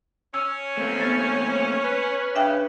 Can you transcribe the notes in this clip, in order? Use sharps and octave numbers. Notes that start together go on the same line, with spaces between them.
C#4 E6
A3 A#3 C4
B3 A6
B4
C#3 D4 E5 G5